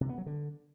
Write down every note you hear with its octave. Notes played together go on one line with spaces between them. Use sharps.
C3
B3
F#3
D3